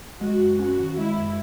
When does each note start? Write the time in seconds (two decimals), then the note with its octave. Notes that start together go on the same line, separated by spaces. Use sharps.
0.21 G#3 F#4
0.40 F#2
0.59 C#4 F#4
0.79 D#3
0.98 G#3 E4
1.18 F#2